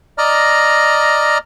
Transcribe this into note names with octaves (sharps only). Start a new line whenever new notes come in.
D5 D#5 A#5 F6